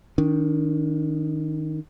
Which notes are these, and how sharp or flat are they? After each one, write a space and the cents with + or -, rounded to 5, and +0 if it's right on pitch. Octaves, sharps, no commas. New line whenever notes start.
D#3 +0 D4 -35